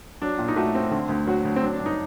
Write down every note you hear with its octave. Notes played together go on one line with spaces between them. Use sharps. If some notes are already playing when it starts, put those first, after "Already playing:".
F#3 D4
A#2
D#4
A3 F#4
C4
D3
D2
F#3 F#4
D2
C4
F#3 D4
D4
G2
D#4